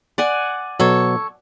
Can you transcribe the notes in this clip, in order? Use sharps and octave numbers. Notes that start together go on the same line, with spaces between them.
D5 F#5 G#5
B2 F#3 A4 C#5